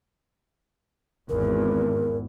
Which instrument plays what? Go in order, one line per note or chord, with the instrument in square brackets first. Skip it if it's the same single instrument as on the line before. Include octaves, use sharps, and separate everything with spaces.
[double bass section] G#1 E2 [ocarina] A#4